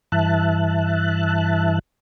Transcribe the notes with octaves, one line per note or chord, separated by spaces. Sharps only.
G2 E3 E5 A5 F#6